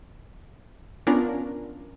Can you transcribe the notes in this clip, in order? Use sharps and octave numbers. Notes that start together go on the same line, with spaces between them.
B3 C#4 D4 F4 A#4